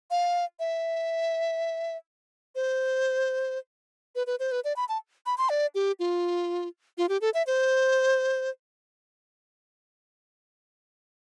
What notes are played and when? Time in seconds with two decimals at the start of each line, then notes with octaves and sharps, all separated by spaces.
0.11 F5
0.59 E5
2.55 C5
4.16 B4
4.27 B4
4.40 C5
4.52 B4
4.64 D5
4.76 B5
4.89 A5
5.26 B5
5.38 C6
5.49 D5
5.75 G4
6.00 F4
6.98 F4
7.09 G4
7.21 A4
7.34 E5
7.47 C5